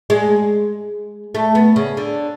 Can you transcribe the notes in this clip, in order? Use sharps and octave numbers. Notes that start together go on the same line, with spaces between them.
G#3
A3
B3
C#3
D3